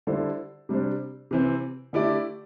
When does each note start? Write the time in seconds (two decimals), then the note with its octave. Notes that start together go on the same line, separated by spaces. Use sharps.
0.07 D3 G3 E4 A4 C5
0.69 C3 G3 D4 C5
1.31 C3 E3 C4
1.93 D3 A3 E4 G4 D5